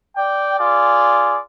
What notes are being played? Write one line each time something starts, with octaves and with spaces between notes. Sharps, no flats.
D5 G5
F4 G#4 D5